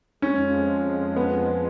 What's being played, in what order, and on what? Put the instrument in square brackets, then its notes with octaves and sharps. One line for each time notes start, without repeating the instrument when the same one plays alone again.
[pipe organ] F2 F3 G#3 [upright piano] C#4
[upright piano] B3